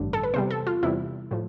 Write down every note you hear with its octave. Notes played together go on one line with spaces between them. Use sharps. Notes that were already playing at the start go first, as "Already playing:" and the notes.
Already playing: A1 G2 D3 A3 D4
A4
B4
E2 C3 G3 C5
A4
F4
E2 C3 G3 E4
A2 F3